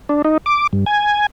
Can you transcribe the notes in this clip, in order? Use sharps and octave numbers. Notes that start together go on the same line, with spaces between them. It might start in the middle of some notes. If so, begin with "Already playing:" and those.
D4
D#4
D6
G2
G#5